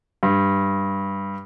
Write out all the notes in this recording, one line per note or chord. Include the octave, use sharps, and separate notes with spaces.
G2